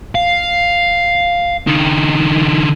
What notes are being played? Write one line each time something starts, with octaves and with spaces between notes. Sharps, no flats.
F5
D3 D#4